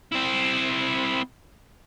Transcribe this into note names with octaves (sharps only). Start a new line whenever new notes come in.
C4 E4